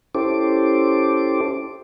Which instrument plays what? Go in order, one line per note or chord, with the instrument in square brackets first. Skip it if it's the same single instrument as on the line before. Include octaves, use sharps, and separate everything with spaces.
[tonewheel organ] C#4 E4 G4 A4 C5 D6